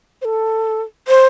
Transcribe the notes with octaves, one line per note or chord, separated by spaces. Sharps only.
C5
A4
C5